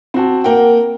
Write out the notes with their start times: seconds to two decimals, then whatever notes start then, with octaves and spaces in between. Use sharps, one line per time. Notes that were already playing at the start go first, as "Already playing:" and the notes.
0.14 C4 F#4 A5
0.44 A#3 A#4 F#5 G5